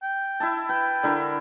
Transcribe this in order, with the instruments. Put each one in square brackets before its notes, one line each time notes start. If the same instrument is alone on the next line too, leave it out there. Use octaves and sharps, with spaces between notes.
[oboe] G5
[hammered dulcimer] E4 E5 A5
[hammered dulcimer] B4 [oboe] G5
[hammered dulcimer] D3 E4 A#4